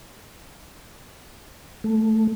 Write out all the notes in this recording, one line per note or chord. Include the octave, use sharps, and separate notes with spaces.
A3